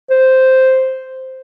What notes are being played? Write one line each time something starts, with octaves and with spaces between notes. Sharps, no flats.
C5